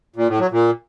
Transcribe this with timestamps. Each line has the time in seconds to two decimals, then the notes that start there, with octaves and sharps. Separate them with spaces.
0.16 A#2
0.28 A2
0.40 F#3
0.51 A#2